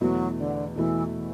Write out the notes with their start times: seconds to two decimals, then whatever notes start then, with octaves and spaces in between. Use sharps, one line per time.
0.01 E2 B2 F#3 A3 E4
0.38 D3
0.76 E2 B2 E3 A3 E4
1.14 E3